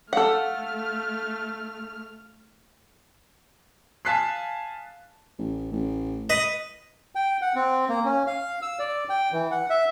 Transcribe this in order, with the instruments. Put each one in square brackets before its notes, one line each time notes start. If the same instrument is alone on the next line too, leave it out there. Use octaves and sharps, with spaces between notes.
[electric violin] A3 F6 [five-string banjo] A4 F#5 [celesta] F5
[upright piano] F5 G#5 A5 F#6 B6 C7
[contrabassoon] A1
A1
[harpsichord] B4 D#5
[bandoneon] G5
F#5
C4
A#3
C#4
F5
E6
D5
G5
E3
F#5
E5